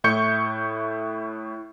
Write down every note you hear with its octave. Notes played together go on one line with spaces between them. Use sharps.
A2 E4 C#6 G6 C#7